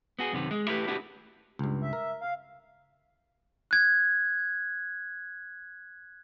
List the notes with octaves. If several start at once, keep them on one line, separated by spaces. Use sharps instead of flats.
B3 F#4 G#4
F#2 C3 D#3 B3
G#3
A3 E4 G4 G#4 B4
B3 D4 E4 F#4 G4
C#2 G2
E5
A#4
F5
F#6 G#6